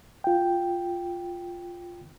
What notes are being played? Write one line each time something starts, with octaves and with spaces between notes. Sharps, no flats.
F4 G5